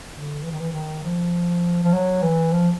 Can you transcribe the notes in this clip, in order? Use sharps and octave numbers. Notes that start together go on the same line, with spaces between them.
D3
E3
D#3
E3
D#3
F3
F3
F#3
E3
F3